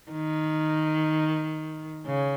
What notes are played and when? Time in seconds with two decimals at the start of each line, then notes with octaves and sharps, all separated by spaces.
0.12 D#3
2.06 C#3